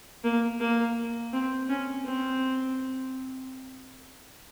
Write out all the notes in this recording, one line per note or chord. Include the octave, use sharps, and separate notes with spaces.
A#3
A#3
C4
C#4
C4